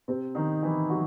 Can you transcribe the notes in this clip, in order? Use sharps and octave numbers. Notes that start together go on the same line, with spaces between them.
C3 C4
D#3 D#4
E3 E4
F#3 F#4